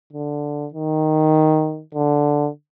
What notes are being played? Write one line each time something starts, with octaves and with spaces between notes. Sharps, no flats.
D3
D#3
D3